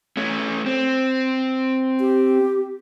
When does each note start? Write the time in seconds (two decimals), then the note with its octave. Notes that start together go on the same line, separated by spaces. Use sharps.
0.17 A3 C#4
0.66 C4
2.00 G4